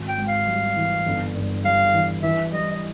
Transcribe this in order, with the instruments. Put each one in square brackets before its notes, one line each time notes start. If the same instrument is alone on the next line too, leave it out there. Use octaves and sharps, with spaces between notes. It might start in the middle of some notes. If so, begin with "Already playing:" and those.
Already playing: [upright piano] G#1
[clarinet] G5
[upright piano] G#2
[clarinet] F5
[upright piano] G3
E3
G1
G2
[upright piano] G3 [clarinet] F5
[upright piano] E3
[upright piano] E3 [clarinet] E5
[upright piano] G3 [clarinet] D#5
[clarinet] D#5